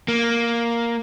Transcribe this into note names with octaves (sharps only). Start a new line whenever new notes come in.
A#3